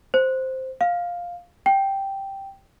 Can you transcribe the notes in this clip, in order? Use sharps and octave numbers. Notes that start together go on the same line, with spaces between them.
C5
F5
G5